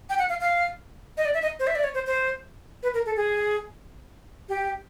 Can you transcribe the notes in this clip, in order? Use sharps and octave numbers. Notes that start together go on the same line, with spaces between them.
G5
F#5
F5
F5
D#5
D5
E5
D#5
C5
E5
D5
C#5
C5
C5
B4
A#4
A4
G#4
G4